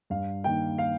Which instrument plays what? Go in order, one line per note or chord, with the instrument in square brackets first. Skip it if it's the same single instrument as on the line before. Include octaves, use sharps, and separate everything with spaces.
[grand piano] G2 F5
D#3 A#3 G5
F5